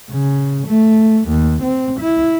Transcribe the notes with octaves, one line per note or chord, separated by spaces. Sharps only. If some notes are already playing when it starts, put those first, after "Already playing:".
C#3
A3
D#2
C4
E4